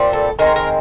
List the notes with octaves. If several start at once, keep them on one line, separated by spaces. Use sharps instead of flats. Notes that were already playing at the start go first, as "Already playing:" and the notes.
Already playing: A#2 G3 C4
A4
D#3 G#3 C4 A#4
A#4